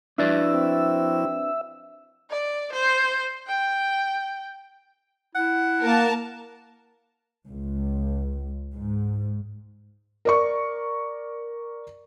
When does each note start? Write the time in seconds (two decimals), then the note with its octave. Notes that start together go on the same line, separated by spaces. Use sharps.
0.18 F3 D4 E4 F#4 B4 D5 E5
0.51 C4
2.30 D5
2.72 C5
3.47 G5
5.35 E4 F#5
5.81 A#3 A#4 A5
7.49 C#2
8.76 G#2
10.25 A#4 D5 C#6